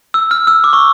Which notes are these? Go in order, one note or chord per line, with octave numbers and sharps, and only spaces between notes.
E6
F6
E6
D6
C#6